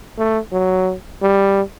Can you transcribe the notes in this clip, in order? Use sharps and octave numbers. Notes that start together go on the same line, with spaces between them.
A3
F#3
G3